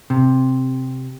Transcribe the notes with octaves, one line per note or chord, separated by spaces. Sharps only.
C3